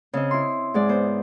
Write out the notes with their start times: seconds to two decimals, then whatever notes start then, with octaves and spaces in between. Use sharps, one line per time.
0.13 C#3 C4 D#5
0.31 E4 C6
0.74 G#2 G#3 D5
0.89 B3 C5